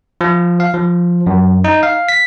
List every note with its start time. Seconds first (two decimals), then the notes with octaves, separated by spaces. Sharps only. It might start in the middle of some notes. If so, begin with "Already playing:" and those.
0.21 F3
0.60 F5
0.74 F3
1.27 F#2
1.64 D#4
1.83 F5
2.09 B6